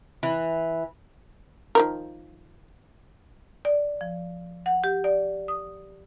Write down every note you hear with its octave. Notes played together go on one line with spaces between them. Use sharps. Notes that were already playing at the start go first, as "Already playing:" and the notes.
E3
D#3 F3 A#4
D5
F3
F#5
G4
D5
D#6